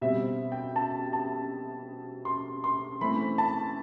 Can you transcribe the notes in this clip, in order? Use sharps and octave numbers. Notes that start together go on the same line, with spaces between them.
B2 G3 C4 E5
G5
A5
A5
C6
C6
E3 A3 C4 B5
A5